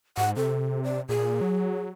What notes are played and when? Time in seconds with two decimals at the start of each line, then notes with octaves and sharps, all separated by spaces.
0.17 G#2 F#5
0.36 C3 A4
0.84 D5
1.09 A#2 G#4
1.41 F#3